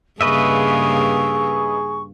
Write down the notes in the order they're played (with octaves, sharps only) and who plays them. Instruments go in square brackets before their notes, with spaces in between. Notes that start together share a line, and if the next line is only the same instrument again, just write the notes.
[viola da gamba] G2 C#3 A#3 [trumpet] G#4 [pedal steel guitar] B4 D#5 E5 [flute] C#6